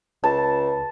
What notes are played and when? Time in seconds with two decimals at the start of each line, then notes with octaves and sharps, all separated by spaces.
0.24 C#2 A5